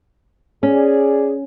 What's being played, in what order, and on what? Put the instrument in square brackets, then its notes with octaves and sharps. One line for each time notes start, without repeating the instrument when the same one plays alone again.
[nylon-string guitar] C#4 [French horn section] G#4 D5